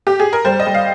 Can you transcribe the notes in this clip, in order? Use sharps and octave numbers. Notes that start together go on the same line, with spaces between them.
G4
G#4
A#4
G3 C5
D#5
G3
F5